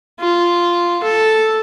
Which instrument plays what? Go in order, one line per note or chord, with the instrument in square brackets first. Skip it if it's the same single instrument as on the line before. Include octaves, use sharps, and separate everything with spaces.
[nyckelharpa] F4
A4